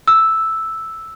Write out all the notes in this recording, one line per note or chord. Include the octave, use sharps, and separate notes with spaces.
E6